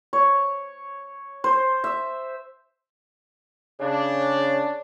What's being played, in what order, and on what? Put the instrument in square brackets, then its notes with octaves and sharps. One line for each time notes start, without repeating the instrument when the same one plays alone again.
[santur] C#5
C5
E5
[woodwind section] C#3 [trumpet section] D4